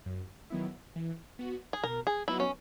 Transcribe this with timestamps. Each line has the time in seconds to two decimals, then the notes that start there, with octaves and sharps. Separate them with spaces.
0.06 F#2
0.50 D#3 F#3 B3 E4
0.96 E3
1.39 B3 F#4
1.73 G#4
1.84 B2 A#4
2.07 G#4
2.28 F#3 B3 D#4 E4 F#4
2.40 C#4